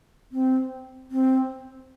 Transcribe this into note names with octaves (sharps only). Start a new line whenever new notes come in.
C4
C4